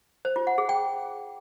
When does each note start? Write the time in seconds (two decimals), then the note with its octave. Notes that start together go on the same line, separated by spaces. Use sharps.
0.25 C5
0.36 F4
0.47 F#5
0.58 G#4
0.69 G5